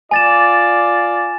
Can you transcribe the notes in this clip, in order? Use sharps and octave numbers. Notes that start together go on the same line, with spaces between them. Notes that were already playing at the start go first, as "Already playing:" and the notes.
F4 D5 G#5 A6 E7